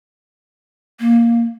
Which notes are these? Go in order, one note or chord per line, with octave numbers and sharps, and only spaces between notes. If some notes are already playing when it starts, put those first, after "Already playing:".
A#3